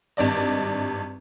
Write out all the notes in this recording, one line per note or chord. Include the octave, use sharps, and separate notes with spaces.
G#1 G2 D5 D#5